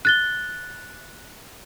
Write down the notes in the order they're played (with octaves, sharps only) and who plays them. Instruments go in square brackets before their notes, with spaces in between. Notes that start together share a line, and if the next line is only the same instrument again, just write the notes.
[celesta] F#6 A6 G7